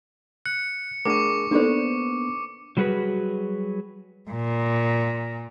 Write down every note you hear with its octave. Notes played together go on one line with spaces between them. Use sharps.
F#6 C#7
A3 D4 G#4 A#4 C#6 D6
A#3 B3 D4 D#4 G4 A4 C5 D5
F#3 G3 A3 F#4 G#4 B4
A#2